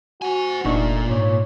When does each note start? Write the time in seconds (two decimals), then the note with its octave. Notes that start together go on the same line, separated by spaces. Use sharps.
0.22 F#4 C5 G#5
0.65 F1 A#2 A3 D4 D#4 C#6
1.10 G#2 C#5